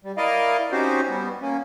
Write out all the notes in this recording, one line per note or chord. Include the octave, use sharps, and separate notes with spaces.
G3
E4 A#4 D5 D#5 F5
C4 C#4 D#4 F#4 G4 C5
G3 B3
A#3 C#4